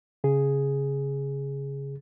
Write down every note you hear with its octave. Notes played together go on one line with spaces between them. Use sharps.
C#3 G#4